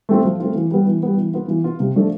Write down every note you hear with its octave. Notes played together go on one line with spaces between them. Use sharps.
A3 C4 F4
F3
A3 C4 F4
E3
G3 B3
E3
G3 B3
E3
B3 F4
E3
B3 F4
C3
F3 A3 D4